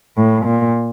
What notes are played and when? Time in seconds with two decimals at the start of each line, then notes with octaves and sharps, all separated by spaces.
0.17 A2
0.46 A#2